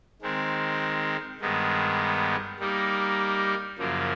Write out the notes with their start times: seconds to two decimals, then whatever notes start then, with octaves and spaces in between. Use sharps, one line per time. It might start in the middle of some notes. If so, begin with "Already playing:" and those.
0.21 D#3 G#3 C4
1.40 G2 D#3 G#3 B3
2.60 G3 A#3 D#4
3.78 F#2 C#3 F3 A#3